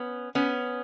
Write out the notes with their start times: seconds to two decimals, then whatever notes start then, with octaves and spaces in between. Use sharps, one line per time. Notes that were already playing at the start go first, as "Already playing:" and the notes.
Already playing: B3 C#4
0.35 B3 C#4